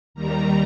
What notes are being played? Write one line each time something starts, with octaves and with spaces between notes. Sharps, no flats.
D#2 D#3 G3 A#5